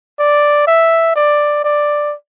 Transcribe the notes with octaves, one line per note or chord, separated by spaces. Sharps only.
D5
E5
D5
D5